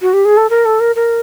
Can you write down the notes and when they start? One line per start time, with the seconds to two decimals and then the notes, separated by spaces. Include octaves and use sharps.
0.01 F#4
0.13 G4
0.25 G#4
0.37 A4
0.50 A#4
0.65 A4
0.80 A#4
0.96 A#4